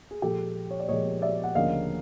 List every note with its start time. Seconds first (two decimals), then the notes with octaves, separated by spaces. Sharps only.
0.11 G#4
0.22 A#2 F3 G#3 G4 A4
0.71 C#5
0.80 D5
0.88 A#2 F3 G#3 C#5 D#5
1.22 D5 E5
1.44 F#5
1.55 D2 C#3 F3 A#3 C#4 D#5 F5